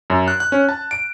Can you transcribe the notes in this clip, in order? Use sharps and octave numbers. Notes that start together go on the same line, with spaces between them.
F#2
F#6
F#6
C#4
A5
D7